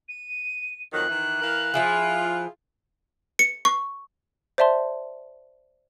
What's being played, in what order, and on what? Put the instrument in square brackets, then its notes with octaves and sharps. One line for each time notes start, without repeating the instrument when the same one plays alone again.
[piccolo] D#7
[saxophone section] F2 D#3 F#3 [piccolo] F#6
[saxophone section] D#3 E3
E3 A#4 F5
[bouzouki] F3 E4 G#4 [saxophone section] F4
[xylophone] C#7
C#6
C5 D5 E5 A5 C6